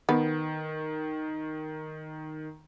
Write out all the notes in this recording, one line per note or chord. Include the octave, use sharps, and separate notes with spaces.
D#3 B3